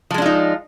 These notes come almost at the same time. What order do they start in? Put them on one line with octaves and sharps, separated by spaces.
F3 G#3 D4 F4 D#4